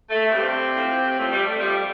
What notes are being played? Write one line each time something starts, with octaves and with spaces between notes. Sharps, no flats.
A3
G2 C3 G3 C4
A2 F3
A2 F3 A3
G3
A3
F2 F3 G3